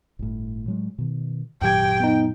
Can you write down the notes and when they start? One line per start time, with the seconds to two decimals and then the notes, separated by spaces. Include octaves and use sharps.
0.19 G1 A2
0.66 A2 F#3 G#3
0.98 B2 D#3
1.62 G#1 F#2 A#2 F#3 G4 G5 G#6
2.00 B3 D#4